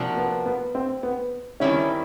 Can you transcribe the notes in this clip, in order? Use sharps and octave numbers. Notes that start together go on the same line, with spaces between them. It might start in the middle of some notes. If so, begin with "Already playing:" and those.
Already playing: C3 F3 A#3 D4 F#4
B3
B3
C4
B3
D#3 G3 C4 C#4 E4